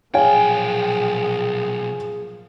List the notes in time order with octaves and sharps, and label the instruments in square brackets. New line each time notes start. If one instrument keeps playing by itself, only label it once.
[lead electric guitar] B1 G5 [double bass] A#2 F3 [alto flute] G#4 [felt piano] C#5 F5 G#5